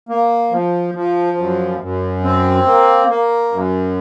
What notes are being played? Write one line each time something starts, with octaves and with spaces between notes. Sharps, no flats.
A#3
F3
F3
F#2
F#2
C4
A#3
A#3
F#2